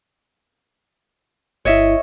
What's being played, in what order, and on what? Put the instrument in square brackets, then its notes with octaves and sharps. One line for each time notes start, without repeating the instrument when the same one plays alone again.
[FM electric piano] G1 E4 [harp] C#5 D#5 E5